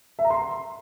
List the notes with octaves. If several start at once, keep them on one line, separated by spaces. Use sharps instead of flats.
E5
A#5
C6